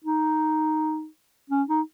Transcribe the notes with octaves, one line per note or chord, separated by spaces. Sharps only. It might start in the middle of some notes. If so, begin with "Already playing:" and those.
D#4
C#4
D#4